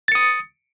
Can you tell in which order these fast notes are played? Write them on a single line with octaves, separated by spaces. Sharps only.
A6 C#7 D#6